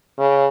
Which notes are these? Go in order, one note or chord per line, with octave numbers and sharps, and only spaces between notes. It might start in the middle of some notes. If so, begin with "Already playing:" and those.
C#3